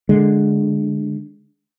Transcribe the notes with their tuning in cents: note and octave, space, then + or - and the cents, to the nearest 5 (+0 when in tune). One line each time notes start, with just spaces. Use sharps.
D3 +0 G#3 +0